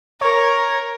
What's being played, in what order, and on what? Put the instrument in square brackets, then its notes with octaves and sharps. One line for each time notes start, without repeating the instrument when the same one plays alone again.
[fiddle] A#4 [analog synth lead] C#5